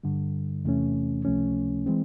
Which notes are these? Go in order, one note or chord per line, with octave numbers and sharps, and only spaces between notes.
G2 D3 G3
E2 C3 E3 A3 C#4
C#2 C3 F3 A3 C#4
E3 G#3 C4